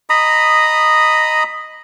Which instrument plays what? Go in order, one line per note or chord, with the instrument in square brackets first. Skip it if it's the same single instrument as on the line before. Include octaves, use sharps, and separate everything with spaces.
[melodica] D#5 A#5 B5 D#6